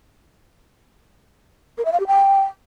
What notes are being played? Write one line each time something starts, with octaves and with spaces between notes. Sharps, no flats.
A#4
E5
F5
G4
G5